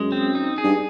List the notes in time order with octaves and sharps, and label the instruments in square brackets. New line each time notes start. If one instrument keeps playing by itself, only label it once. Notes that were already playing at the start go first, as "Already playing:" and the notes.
Already playing: [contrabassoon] F#2 [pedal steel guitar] G#3
[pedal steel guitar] C4
D#4
G#4
[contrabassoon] G2